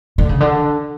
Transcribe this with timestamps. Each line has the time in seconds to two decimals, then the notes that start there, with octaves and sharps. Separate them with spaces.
0.18 D3
0.29 C#3
0.40 D3